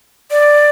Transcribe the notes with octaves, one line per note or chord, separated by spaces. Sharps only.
D5